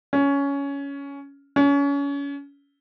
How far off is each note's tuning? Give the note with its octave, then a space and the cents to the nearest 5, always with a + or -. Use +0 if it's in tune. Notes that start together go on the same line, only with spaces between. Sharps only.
C#4 +15
C#4 +30